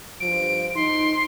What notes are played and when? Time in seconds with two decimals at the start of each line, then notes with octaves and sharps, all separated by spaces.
0.20 G2 F3 D7
0.75 D#4 C6